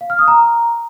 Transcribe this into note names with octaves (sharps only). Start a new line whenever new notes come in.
F5
F6
D#6
A#5